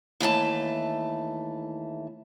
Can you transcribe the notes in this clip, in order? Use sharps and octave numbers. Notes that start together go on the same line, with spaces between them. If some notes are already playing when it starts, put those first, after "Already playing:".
D#2 E3 A3 A5